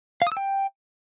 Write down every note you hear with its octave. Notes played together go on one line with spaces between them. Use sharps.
F5
D#6
E6
G5